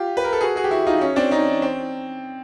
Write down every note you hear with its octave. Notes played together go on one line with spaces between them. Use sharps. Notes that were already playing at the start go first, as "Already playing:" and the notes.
Already playing: F4 G4
B4
A#4
A4
F#4 G#4
F#4 G#4
G4
E4 F#4
D#4 F4
C#4
C4 D4
C#4 D#4
C4